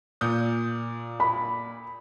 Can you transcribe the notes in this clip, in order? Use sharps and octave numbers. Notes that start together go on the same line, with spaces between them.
A#2 D#6 G6
B5